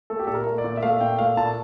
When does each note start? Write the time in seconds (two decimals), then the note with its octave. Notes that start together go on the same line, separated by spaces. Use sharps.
0.10 A3 A4
0.19 G4
0.27 A#2 A4
0.34 A#4
0.46 A3
0.58 D5
0.64 A#2
0.77 E5
0.83 A3 F5
1.01 A#2 G5
1.18 A3 F5
1.37 A#2 A5